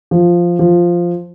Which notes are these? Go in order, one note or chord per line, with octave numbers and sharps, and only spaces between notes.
F3
F3